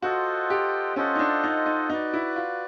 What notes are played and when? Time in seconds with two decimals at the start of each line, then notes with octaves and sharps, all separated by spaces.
0.02 F4 F#4 A4 C5 D#5 F#5
0.50 G4
0.96 C#4 F4 A4 C5 D#5 F#5
1.15 D#4
1.19 D4
1.44 D#4
1.66 D#4
1.90 D#4 F#4 B4 D5
2.13 E4
2.36 F4